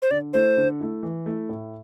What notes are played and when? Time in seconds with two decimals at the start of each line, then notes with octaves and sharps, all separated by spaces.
0.02 C5
0.11 D3 D5
0.33 A3 E4 C5
0.57 D3
0.80 A3 E4
1.03 E3
1.26 A3 E4
1.49 A2